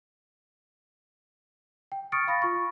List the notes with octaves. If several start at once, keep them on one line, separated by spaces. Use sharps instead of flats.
G5
C#6 D#6 F6 A6 C#7 D7
F5 B5 A6 A#6
F4 C#6